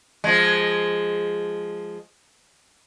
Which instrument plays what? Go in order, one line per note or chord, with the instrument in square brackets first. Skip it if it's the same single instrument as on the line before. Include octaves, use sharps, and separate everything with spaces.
[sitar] F3 G#3